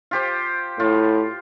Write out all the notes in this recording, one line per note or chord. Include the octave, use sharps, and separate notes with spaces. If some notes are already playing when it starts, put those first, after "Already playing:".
F4 G4 C5
A2 F4